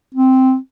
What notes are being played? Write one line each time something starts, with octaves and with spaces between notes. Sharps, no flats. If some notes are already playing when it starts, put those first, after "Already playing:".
C4